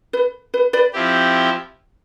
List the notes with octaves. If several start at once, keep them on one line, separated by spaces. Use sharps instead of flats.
B4
B4
B4 D5
F3 C4 E4 G4